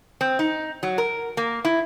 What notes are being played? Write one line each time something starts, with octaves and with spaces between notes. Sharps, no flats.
C4
D#4
F#3
A#4
A#3
E4